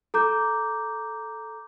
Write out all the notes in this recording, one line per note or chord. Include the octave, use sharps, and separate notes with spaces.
A4 A#5 D6 G6